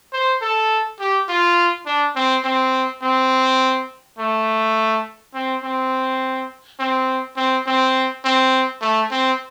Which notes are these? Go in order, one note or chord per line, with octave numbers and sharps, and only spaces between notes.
C5
A4
G4
F4
D4
C4
C4
C4
A3
C4
C4
C4
C4
C4
C4
A3
C4